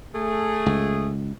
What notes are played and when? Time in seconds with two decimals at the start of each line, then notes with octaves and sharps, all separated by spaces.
0.15 A3 G#4
0.66 C#2